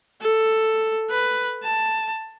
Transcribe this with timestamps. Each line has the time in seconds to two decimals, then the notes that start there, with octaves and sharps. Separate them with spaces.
0.21 A4
1.10 B4
1.63 A5